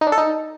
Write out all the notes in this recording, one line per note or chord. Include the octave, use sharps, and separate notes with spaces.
D#4
D4
A4
D#4